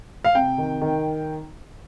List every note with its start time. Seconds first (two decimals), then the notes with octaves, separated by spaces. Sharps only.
0.25 F5
0.35 C3 G5
0.58 D#3
0.81 D#3